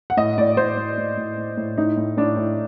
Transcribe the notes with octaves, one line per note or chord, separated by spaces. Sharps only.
F#5
A2 D#5
A2 D5
A2 C5
A2
A2
A2
A2
A2
A2 D#4
A2
A2 D4
A2